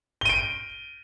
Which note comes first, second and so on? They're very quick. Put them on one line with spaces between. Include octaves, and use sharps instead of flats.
G7 D#7 D7